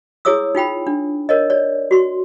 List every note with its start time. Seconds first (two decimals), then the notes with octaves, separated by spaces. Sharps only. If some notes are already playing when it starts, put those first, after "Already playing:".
0.25 E4 G#4 C#5 D#6 E6
0.55 D#4 F4 G5 B5
0.87 D4
1.29 A#4 C#5 D#5
1.50 C#5 D5
1.91 F#4 C6